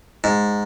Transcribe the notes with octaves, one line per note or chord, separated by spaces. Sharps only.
G#2